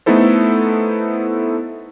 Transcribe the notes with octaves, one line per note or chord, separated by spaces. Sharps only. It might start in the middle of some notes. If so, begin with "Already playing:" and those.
A3 B3 D#4 E4 A4 C5